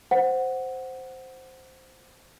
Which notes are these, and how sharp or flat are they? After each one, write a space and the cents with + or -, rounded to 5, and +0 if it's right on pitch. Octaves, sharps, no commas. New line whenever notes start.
C5 +0 F#5 +0